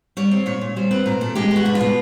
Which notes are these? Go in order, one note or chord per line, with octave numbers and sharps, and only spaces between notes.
G3 C#5
C4
A#2 C#5
A#2
G3 C5
C4 B4
A#2 A#4
A#2 A4
G#3 G4
B3 F#4
B2
F4
B2